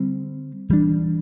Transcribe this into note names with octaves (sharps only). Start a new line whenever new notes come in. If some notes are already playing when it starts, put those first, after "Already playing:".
Already playing: D3 G3 C4
E3 G3 D4